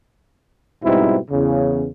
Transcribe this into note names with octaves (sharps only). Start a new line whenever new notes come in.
G#2 B2 G3 C4 D#4 E4
E2 C#3